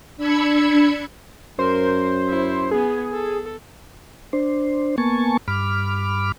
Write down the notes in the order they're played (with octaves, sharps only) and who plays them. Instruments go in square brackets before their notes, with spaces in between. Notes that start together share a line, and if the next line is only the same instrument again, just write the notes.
[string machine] D4 B5 E6 G#6 C#7
[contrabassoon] F#2 [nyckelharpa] A#4 [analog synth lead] C5
[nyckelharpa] E4
[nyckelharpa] B3 [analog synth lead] G#4
[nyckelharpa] A4
[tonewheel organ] D4 C5
A#3 B3 G#5 A5 C#6
G2 B5 D6 F6